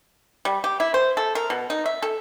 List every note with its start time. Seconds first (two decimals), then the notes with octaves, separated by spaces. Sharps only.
0.45 G3
0.64 G4
0.80 E4
0.94 C5
1.17 A4
1.35 A#4
1.50 B2
1.70 D#4
1.86 E5
2.02 A4